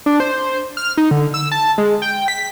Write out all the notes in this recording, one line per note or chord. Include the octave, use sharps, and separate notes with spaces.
D4
C5
F6
D#4
D3
E6
A5
G#3
G5
B6